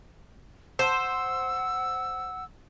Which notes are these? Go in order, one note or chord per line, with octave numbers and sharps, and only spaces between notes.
C5 F#5 E6